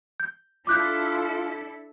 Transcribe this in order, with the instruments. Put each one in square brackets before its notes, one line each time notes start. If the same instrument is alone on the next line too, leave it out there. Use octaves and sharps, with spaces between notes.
[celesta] G6
[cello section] D4 E4 A4 [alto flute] F4 [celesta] D6 F#6 G6